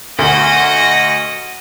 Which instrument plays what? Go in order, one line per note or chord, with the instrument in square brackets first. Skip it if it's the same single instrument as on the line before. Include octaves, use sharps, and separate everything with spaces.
[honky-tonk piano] D2 [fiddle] F#4 D#5